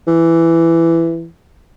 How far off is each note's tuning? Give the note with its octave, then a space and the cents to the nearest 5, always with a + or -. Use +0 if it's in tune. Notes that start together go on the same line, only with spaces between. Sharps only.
E3 +10